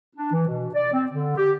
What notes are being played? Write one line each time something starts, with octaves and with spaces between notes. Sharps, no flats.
D4
E3
B2
D5
C4
D3
G4